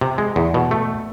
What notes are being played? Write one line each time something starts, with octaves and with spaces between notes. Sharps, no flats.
C3
G#3
E2
B2
A3